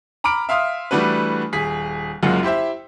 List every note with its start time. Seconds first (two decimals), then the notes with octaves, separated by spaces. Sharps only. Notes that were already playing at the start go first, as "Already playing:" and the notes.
0.24 A#5 B5 D6 F6 D7
0.49 E5 F5 C6 D#6 F6
0.91 E3 G3 A3 D4 F#4 B4
1.53 D#1 G#4 B6
2.23 F#1 F#2 G#3 A#3 F4 F#5
2.43 E4 G4 C5 E5